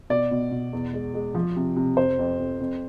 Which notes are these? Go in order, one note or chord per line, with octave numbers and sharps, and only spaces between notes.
B2 D5
B2
B2
E2
G#3
G#3
F3
C3
C3
F2 C5
F2
F2
F2